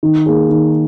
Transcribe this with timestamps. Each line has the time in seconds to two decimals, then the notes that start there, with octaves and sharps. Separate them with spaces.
0.03 D#3
0.26 A#3 G#4
0.49 D#3